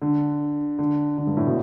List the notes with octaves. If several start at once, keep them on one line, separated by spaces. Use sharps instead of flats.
D3
D3
D3
G2
A2
B2